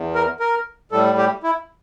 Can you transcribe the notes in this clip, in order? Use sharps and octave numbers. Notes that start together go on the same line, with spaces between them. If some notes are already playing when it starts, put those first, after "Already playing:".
Already playing: E2
A#4
A#4
A2 G3 A4
G4
E4